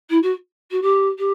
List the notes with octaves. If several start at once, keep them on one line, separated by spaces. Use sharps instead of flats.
E4
F#4
F#4
G4
G4